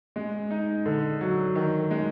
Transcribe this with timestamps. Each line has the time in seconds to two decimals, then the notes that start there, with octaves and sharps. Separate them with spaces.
0.16 G#3
0.51 D#4
0.86 D3
1.21 F#3
1.55 D#3
1.91 G#3